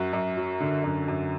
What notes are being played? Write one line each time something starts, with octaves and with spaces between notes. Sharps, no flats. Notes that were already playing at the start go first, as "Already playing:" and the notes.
Already playing: F#2 F#4
F#2
F#3
D3
F#2
F#2